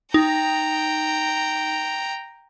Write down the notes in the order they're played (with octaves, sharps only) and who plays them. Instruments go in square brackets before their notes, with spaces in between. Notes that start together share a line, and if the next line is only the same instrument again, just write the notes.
[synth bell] D#4 [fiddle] G5 A#5